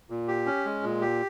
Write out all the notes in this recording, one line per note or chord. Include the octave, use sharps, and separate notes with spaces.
A#2
G4
C#4
G#3
A#2
G4